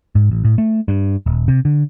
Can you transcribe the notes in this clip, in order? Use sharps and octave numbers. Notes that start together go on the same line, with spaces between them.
G#2
A1
A2
A3
G2
D#1
C3
D3